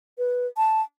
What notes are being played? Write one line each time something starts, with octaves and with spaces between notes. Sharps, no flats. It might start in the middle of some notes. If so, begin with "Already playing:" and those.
B4
A5